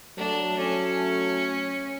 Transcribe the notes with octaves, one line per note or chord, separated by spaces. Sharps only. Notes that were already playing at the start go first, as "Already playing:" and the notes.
F#3 A3 D4
F#3 A3 C#4